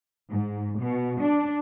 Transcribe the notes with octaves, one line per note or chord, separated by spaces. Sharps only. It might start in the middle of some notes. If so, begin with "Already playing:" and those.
G#2
B2
D4